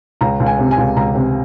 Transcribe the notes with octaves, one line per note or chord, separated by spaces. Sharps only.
C#2 A#5
C#2
G#5
C3
G#5
C#2
C#2 A#5
C3